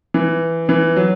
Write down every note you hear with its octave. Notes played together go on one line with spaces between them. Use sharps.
E3
E3
F#3